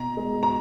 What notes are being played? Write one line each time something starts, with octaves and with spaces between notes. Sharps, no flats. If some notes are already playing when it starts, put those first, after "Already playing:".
Already playing: B2 A#5
G#3
A#5